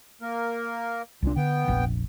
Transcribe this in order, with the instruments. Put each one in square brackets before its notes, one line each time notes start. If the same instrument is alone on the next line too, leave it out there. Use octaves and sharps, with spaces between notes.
[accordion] A#3 A#4
[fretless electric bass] C2 D4 [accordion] A#2
[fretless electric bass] D3 [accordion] B3 G5
[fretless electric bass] F1 A#1